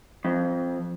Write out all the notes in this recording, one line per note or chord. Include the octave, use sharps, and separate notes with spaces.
F2